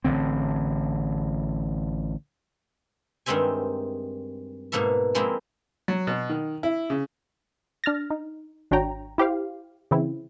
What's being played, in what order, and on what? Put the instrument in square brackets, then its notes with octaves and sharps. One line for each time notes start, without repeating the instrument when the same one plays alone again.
[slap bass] A1 D3 C4
[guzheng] G2 D#3 G#3 C4 E5 G#5
G#2 B2 A#3 A4 E5
F3 G#3 A#3 C4 E4
[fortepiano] F#3
B2
D#3
E4
C#3
[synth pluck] D4 F6 A6 A#6
D#4
G#1 D4 F#4 C#5 G5 A#5
E4 G4 C5 F5
C#3 E3 C4 E4